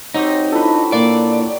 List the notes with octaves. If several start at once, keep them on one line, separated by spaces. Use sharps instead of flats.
F#3 C4 D#4 G4
D4 E4 F4 A4 B4
A#2 D5